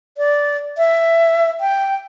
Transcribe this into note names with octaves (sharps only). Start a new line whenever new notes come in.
D5
E5
G5